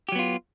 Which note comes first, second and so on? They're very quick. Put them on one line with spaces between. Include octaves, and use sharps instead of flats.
G4 F#3 B3 F4